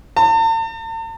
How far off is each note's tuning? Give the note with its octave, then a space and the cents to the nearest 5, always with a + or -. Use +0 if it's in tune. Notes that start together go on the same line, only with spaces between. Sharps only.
A5 +45